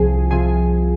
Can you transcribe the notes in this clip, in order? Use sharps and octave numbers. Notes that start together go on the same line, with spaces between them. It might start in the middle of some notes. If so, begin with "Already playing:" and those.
Already playing: C2 C3 F3 G#4
C3 F3 G#4